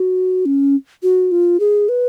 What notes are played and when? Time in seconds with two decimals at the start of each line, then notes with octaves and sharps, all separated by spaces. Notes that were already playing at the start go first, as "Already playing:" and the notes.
Already playing: F#4
0.46 C#4
1.03 F#4
1.32 F4
1.60 G#4
1.89 B4